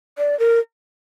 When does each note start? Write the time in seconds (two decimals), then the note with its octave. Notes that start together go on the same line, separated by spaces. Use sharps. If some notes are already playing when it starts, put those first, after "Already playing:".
0.18 D5
0.39 A#4